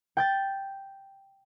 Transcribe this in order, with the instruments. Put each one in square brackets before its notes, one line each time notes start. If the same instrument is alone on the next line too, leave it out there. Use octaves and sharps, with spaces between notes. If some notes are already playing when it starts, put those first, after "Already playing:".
[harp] G5 G6 A6